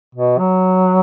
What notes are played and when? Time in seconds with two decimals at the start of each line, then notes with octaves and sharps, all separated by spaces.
0.15 B2
0.39 F#3